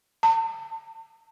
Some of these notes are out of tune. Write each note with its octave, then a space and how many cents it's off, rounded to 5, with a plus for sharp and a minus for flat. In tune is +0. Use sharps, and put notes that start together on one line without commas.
A5 +35